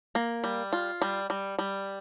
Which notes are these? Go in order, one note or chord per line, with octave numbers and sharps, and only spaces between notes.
A#3
G3
F4
G3
G3
G3